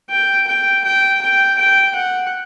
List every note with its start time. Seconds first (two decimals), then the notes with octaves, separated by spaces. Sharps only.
0.10 G5
0.48 G5
0.85 G5
1.22 G5
1.59 G5
1.96 F#5